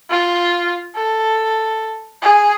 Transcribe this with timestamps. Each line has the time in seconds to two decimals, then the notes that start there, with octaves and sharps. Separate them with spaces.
0.10 F4
0.96 A4
2.22 G#4